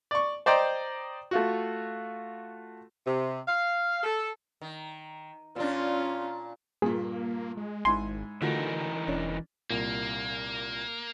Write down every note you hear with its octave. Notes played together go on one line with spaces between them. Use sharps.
D5 C#6
C5 D5 D#5 G5 A#5
A3 F4 F#4
C3
F5
A4
D#3
A#2 C#4 D4 F4
G2 A#2 A#3 G#4
G#3
G#1 G#2 E4 G#5 C6
D3 E3 A3 D#4 F4 F#4 A#4
E1 C#4 D4
C2 A#2 A#3